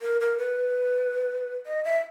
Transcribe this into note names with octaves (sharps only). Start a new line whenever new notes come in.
A#4
A#4
B4
D#5
E5